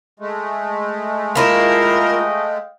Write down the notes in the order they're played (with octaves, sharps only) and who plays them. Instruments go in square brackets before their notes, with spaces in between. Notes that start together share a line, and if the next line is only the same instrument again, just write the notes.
[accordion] G#3 A3
[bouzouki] A#3 E4 F4 [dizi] A#4 [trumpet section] D#5 F5 G5